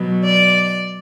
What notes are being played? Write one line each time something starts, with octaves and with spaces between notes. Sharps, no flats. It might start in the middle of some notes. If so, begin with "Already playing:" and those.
Already playing: B2 F#3 B3
D5